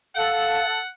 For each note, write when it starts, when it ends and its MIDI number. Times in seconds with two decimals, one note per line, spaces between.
0.16 0.79 69
0.16 0.65 77
0.16 0.89 78